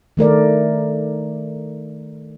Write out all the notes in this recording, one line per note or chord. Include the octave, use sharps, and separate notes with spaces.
D#3 A3 A#4 D5